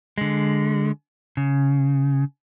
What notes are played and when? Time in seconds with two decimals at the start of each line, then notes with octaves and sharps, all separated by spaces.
0.18 D3 G#3
1.37 C#3